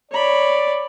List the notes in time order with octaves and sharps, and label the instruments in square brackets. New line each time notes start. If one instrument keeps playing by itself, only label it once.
[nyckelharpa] C#5 B5 [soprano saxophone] D5